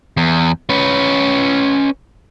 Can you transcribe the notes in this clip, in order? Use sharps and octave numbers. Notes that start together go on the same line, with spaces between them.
E2
C#4 B4